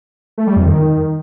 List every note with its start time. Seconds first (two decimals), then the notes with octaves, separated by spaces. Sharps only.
0.38 A3
0.47 G3
0.56 F2
0.66 D#3